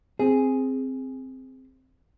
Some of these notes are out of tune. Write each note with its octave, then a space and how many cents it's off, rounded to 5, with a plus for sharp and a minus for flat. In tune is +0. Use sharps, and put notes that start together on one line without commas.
C4 +0 G#4 +0